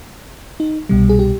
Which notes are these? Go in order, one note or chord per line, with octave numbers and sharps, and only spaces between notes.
D#4
C2 B2 G3
G#4
G4